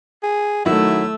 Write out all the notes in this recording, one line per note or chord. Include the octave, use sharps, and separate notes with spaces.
G#4
D#3 F#3 A3 E4 E6